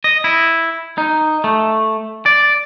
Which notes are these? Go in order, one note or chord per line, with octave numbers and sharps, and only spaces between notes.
D#5
E4
D#4
A3
D5